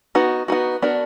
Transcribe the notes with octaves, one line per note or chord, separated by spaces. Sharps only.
B3 D#4 F#4
B3 D#4 F#4
B3 D4 F#4 A#4